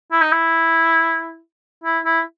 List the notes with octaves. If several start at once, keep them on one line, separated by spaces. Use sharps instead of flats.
E4
D#4
E4
E4
E4